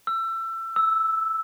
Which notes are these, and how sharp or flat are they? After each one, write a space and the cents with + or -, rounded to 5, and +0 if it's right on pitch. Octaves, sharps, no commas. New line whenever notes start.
E6 +25
E6 -5